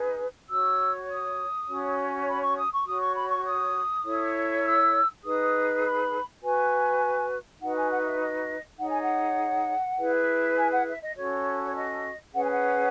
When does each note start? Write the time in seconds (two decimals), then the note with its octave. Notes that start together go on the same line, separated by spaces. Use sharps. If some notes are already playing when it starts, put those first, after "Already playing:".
Already playing: D#4 G#4 B4
0.49 F#4 C#5 E6
1.09 D#6
1.68 C#4 F#4 C#5
2.28 B5
2.41 C#6
2.57 D#6
2.72 C#6
2.86 F#4 C#5 D#6
3.00 C#6
3.14 B5
3.28 C#6
3.45 D#6
4.04 E4 A4 C#5
4.63 E6
5.23 D#4 G#4 B4 D#6
5.83 B5
6.42 F#4 B4 G#5
7.60 D#4 F#4 B4 F#5
7.75 G#5
7.90 F#5
8.00 D#5
8.05 E5
8.19 D#5
8.78 D#4 G#4 C#5 F#5
8.89 G#5
9.00 F#5
9.97 E4 G#4 B4
10.56 G#5
10.71 F#5
10.86 E5
11.01 D#5
11.15 C#4 F#4 A4 C#5
11.63 C#5
11.74 D#5
12.34 C#4 G#4 B4 F#5
12.43 G#5
12.50 F#5